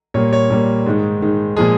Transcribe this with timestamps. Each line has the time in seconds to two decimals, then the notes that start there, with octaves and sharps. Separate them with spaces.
0.14 A#2 G3 A#3 C#5
0.33 C#5
0.50 A#2 G3 A#3
0.86 G#2 D#3 G#3
1.21 G#2 D#3 G#3
1.56 A#2 F3 G#3 G#4